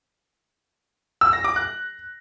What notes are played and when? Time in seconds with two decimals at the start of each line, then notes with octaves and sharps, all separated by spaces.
1.21 E6
1.33 A#6
1.44 D6
1.56 F#6